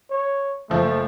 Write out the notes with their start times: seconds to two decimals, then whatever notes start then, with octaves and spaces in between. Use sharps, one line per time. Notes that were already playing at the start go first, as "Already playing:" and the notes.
0.10 C#5
0.70 F#1 F3 A3